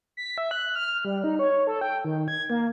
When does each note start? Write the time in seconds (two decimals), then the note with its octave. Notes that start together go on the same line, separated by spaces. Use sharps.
0.17 B6
0.38 E5
0.51 F#6
0.76 F6
1.05 G3
1.24 D#4
1.39 C#5
1.67 A4
1.81 G5
2.05 D#3
2.28 G#6
2.50 A#3